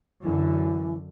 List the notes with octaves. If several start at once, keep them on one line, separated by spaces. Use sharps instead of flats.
F#2 D3 E3